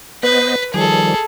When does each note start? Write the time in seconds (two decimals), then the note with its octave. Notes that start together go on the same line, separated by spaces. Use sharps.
0.23 B3 B4 C5 D#5
0.74 D#3 F3 G3 G#4 A4